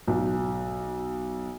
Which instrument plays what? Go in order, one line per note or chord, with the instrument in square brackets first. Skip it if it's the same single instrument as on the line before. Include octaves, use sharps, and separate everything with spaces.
[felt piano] B1